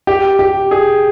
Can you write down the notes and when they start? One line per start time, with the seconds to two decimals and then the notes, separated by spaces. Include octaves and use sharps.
0.07 G4
0.39 G4
0.71 G#4